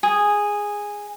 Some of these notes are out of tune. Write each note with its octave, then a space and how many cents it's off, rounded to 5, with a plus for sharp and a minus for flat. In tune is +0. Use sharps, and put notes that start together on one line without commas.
G#4 -10